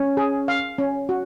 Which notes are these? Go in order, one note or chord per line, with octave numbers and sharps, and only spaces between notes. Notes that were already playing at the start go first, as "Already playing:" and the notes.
Already playing: C#4 C#5
G#4
F5
C#4
F#4